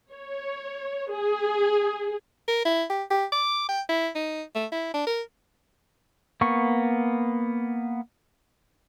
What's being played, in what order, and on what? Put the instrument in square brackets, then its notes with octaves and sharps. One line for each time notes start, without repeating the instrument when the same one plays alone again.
[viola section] C#5
G#4
[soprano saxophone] A#4
E4
G4
G4
D6
G5
E4
D#4
A3
E4
D4
A#4
[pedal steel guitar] A#3 B3 C#6